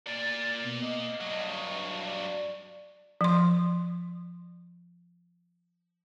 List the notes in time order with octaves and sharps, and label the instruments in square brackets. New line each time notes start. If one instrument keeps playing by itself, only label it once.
[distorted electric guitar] A#3 D5 [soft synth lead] A6
[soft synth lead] B2
D#5
[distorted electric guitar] G2 F#3
[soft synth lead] D5
[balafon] F3 C6